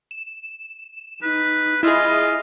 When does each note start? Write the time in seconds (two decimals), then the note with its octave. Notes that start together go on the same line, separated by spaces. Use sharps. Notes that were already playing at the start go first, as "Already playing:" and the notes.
0.11 E7
1.23 D#4 B4
1.83 E4 F4 G#4 D#5